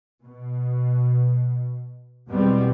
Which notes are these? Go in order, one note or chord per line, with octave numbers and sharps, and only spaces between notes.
B2
E2 G#2 B2 G3 B3 C4